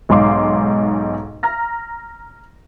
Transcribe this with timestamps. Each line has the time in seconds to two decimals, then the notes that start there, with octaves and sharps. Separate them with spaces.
0.09 B1 G#2 F5 C6 D6
1.43 A#5 F6 A#6